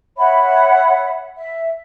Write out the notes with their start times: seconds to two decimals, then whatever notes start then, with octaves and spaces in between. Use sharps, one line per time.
0.17 C#5 E5 F#5 B5
1.35 E5